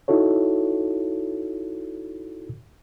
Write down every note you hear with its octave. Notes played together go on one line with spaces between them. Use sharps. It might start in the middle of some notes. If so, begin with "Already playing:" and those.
D#4 E4 F#4 A4 C#5